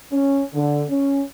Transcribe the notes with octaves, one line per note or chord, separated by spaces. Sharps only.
C#4
D3
C#4